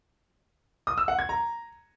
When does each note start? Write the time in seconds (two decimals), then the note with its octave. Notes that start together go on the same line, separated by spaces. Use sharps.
0.87 D#6
0.98 E6
1.08 F#5
1.19 G#6
1.29 A#5